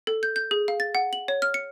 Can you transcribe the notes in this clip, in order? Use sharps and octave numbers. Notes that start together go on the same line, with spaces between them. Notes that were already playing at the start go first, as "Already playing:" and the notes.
A4
G6
G6
G#4
F5
A6
F#5
F#7
C#5
F6
C#7